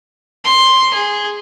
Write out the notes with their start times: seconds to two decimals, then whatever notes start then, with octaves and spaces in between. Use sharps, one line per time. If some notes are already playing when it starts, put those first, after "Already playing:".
0.44 C6
0.94 G#4